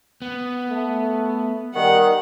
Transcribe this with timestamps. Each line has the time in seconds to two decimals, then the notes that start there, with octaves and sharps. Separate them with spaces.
0.22 B3
0.69 A3
1.75 D#3 G3 F#5